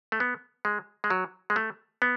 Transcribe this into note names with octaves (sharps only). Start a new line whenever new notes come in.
A3
B3
G#3
G#3
F#3
G#3
A3
B3